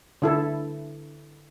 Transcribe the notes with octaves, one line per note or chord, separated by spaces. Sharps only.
D3 E4 A4